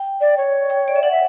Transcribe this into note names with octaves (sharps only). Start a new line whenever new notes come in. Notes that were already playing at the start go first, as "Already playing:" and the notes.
Already playing: G5
D5
C#5
G5
D5
E5
D5 F#5
E5